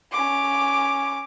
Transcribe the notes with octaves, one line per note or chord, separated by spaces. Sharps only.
C#4 D6